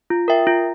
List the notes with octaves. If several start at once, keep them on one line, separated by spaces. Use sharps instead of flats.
F4
A#4 E5 G5
F4